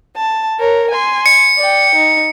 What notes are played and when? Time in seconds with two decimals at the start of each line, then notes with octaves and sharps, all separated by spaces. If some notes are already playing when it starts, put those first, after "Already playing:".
0.16 A5
0.60 A#4 C#5
0.91 G#5 C6
1.26 C#7
1.57 D5 G5
1.95 D#4